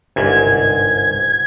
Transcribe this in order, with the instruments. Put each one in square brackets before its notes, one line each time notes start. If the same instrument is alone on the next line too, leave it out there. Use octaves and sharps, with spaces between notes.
[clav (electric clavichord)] G1 C2 G#2 [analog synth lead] G#6